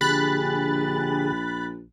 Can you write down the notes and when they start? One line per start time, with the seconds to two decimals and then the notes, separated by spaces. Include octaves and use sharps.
0.01 A#1 D3 G4 G#4 B5 F#6 A6